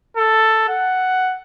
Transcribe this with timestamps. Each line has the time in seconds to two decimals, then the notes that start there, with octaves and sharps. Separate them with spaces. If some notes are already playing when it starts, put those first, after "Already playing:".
0.17 A4
0.69 F#5